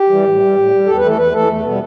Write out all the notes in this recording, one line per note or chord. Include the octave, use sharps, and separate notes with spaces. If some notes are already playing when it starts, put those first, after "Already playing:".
Already playing: G4
E3 G3
A2
G3
A2
G3
E2 A4
B4
E3 A3 A4
E2 B4
E3 A3 A4
E2 A3
B2 G3 B3